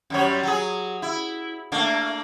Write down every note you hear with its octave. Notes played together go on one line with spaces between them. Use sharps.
F#2 G3 C#5
F#3 G#4
E4
A3 A#3 D4